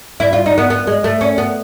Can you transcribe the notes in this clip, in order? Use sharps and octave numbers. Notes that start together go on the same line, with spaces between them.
E4
F4
D#4
B3
B3
G#3
A3
C#4
B3